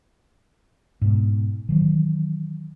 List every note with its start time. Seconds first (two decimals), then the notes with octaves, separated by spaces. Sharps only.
1.01 G#2 B2
1.69 D#3 E3 F#3